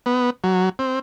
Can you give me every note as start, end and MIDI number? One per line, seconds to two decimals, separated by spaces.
0.06 0.30 59
0.44 0.69 54
0.79 0.99 60